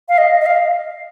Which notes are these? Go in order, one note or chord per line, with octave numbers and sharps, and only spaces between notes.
F5
D#5
D#5
F5